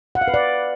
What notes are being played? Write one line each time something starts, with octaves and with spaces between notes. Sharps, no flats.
F#5
F5
B4
D5